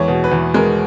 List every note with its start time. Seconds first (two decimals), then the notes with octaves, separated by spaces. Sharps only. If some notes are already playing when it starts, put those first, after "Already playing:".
Already playing: E2 G#3 C#5
0.08 B2
0.24 B4
0.32 E2
0.54 G#3 A#4